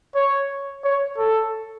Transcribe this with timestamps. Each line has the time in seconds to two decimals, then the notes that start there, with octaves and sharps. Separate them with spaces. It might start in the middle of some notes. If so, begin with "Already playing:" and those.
0.15 C#5
0.84 C#5
1.18 A4